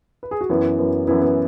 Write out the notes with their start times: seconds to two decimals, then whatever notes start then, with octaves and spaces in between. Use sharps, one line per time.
0.23 B4
0.31 G#4
0.41 F#4
0.50 F#2 E3 B3 E4
0.79 F#2 E3 B3
1.07 F#2 E3 B3 E4
1.22 B3